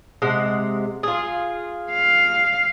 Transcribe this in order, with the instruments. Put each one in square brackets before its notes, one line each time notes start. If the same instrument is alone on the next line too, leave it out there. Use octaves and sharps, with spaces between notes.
[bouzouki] C3 G#3 F#5
F4 G#4
[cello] F5